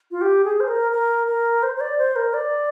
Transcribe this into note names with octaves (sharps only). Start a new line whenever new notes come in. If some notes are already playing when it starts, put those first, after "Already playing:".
F4
G4
G#4
C5
A#4
A#4
A#4
C5
C5
D5
C5
A#4
D5